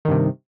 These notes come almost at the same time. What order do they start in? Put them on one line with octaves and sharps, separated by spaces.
D#3 G2 C3